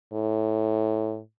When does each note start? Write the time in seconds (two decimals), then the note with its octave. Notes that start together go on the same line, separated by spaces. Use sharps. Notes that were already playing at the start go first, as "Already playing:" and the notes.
0.13 A2